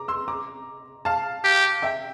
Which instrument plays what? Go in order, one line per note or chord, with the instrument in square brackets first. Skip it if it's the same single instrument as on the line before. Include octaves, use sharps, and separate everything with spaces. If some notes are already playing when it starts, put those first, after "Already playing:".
Already playing: [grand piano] A#5 D6
C6 E6
A#5 D6
F5 A5
[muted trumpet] G4
[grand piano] E5 G5